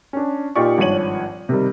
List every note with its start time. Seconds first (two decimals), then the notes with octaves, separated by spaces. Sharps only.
0.13 C#4 D4
0.56 A#2 D#4 F4 G4 D5 C#6
0.78 G#1 G2 F3 C#5 D#7 F#7
1.49 C3 D#3 G3